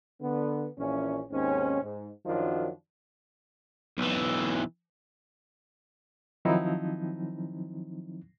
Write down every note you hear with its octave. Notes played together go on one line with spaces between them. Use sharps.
D3 B3
A#1 A#2 E3 C#4
D#2 G#2 C4 C#4
G#2
F#2 D#3 F3 F#3 D4 F4
B1 E3
D#3 F3 F#3 C4 D#4 E4